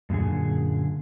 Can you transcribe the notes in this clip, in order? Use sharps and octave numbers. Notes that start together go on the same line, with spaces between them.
F#2 A#2 D3 G#4